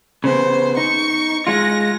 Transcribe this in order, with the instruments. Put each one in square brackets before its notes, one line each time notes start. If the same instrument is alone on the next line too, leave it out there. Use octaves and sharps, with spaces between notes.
[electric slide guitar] C#3 B3 [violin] C5
[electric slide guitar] D#4 [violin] C#6
[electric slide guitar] G#3 F4 [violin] A#6